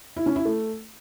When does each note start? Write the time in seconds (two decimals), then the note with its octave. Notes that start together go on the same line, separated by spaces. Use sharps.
0.17 E4
0.26 C#4
0.36 E4
0.45 A3